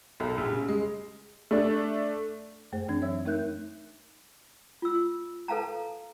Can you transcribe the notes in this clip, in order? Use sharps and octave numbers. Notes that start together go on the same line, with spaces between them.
B1
A#1
C#3
G#3
A3 D4
F#2 A3 G#4 C5
F#2 E3 C4 D4 G#6
F#3 C#5 E5 E6
A3 D#4 A#4 E5 F#6 G6
F4 E6
A4 B4 F5 A5 A#5